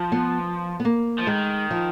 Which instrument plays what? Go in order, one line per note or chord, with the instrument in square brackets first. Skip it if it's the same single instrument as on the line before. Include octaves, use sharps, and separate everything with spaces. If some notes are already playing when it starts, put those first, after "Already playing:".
Already playing: [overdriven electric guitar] F3
[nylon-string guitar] B3
B3
A#3
[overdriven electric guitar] F3
[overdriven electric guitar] D#3 [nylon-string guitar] G#3
[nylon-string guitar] F3